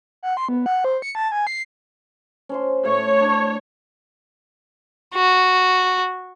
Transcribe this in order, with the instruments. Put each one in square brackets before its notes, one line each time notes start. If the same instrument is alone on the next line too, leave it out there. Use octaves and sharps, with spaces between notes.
[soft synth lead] F#5
C6
B3
F#5
C5
C#7
A5
G#5
C7
[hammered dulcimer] C#4 C5 C6
[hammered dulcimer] A2 [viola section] C#5
[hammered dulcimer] D4
[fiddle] F#4